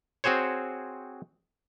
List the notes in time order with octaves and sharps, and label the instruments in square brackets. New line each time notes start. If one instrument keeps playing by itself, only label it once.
[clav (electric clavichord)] C4 F#4 G#4 C5 C#5